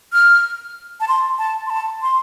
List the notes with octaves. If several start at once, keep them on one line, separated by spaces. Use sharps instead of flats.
F6
A5
C6
A5
C6
A5
C6